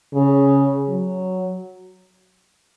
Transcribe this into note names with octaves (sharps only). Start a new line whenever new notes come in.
C#3
F#3